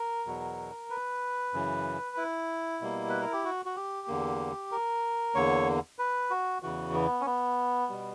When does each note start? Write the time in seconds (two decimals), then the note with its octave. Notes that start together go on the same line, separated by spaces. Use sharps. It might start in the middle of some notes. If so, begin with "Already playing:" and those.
Already playing: A#4
0.26 E2 B2 F#3
0.90 B4
1.53 F#2 C#3 E3
2.17 E4
2.81 B2 G3 A#3
3.09 B4
3.21 A#4
3.33 G4
3.45 F#4
3.65 F#4
3.76 G4
4.08 E2 D3 A#3
4.72 A#4
5.35 E2 D3 A#3 C#5
5.99 B4
6.30 F#4
6.62 E2 C#3 E3 F#4
6.94 B3
7.21 C#4
7.26 B3
7.89 B2 G3